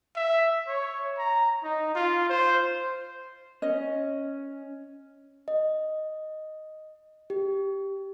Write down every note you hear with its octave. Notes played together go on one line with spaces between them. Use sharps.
E5
C#5
A#5
D#4
F4
C5
C#4 D#5
D#5
G4